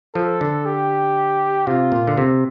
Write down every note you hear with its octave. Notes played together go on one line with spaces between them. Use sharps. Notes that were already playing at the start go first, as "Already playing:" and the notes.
F3 A4
D3
G4
C3 F4
A#2
D3
C3